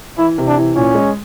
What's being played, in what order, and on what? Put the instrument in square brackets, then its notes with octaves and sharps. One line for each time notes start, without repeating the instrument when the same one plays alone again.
[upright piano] E3 [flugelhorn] E4
[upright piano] C3
[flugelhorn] D4
[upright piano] E3
[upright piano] A#2 [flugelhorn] C#4
[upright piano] G#3